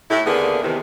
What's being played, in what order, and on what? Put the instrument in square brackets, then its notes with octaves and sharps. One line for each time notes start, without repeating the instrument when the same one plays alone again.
[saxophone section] A2 E4 G4
D#2 D3 A#3 B3 D4 G#4
E2 C3 D#3